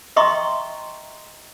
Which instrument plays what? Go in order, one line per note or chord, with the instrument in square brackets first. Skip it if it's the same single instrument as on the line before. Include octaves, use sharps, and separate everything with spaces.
[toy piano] D#5 E5 G5 A#5 C6 C#6